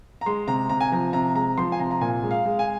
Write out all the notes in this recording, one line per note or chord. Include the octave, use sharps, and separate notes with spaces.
A#5
G#3 C6
C3 A#5
C3 A#5
G#5
F3 A#5
C3 A#5
G#3 A#5
F3 C6
G#5
C3 A#5
A#5
A#2 G#5
G#3
F5
G#3
G#5